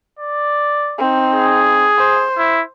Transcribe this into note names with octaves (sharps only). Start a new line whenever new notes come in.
D5
C4 D#4
G#4
C5
E4